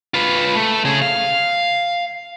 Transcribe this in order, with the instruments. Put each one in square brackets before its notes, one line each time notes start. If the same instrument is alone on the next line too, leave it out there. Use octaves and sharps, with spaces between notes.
[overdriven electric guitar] F4 B4
A3
C#3 G#4
F5